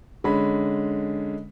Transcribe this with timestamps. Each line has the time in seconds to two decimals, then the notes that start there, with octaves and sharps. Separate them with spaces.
0.24 D3 G#3 C#4 B5